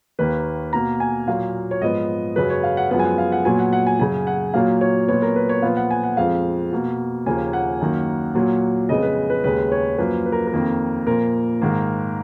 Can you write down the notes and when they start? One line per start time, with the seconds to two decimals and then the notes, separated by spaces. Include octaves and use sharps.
0.19 D#2 D#3 A#3 B4
0.73 B2 A#3 A#5
1.00 G#5
1.27 A#2 F#3 A#3 F5
1.71 C#5
1.81 G#2 F3 B3 D#5
2.36 F#2 C#3 F#3 B4
2.50 C#5
2.63 F5
2.77 F#5
2.91 F#2 F3 G#3 B3 F#5
2.99 G#5
3.05 F#5
3.18 F5
3.32 F#5
3.45 A#2 F#3 B3 G#5
3.59 F#5
3.73 F#5
3.87 G#5
4.00 F#2 C#3 F#3 G#5
4.27 F#5
4.54 A#2 F#3 A#3 F5
4.81 C#5
5.08 A#2 F#3 B3 C#5
5.22 A#4
5.36 B4
5.49 C#5
5.62 A#2 F3 B3 F5
5.77 F#5
5.91 G#5
6.03 F#5
6.17 F2 F3 G#3 F5
6.72 B2 A#3
7.26 D#2 C#3 F3 A#3 G#5
7.53 F#5
7.81 F#2 D#3 A#3
8.35 A#2 F#3 A#3
8.89 F2 C#3 G#3 B3 D#5
9.03 B4
9.30 B4
9.44 D#2 C#3 G#3 B4
9.72 C#5
9.98 F#2 F3 A#3 B4
10.26 B4
10.32 A#4
10.47 A#4
10.53 F2 D#3 A#3
11.07 A#2 F3 A#3 A#4
11.62 G#2 D#3 A#3